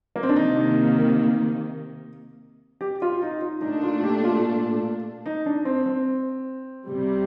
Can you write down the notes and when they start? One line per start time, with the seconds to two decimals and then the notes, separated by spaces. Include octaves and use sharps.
0.16 A#3
0.23 C4
0.29 D4
0.36 C3 D#3 A#3 D#4
2.81 G4
3.02 F4
3.22 D#4
3.42 F4
3.62 A#2 A3 D4 D#4
3.83 F4
4.03 G4
4.24 F4
5.26 D#4
5.46 D4
5.65 C4
5.86 C4
6.88 C2 C3 G3